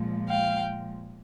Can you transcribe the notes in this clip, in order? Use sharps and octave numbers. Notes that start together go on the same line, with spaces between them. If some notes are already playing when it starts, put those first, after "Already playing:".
Already playing: A#2 F3 G#3
F5 G5